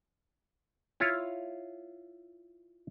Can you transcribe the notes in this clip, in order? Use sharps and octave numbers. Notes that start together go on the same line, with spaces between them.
E4 F4 C#5 F5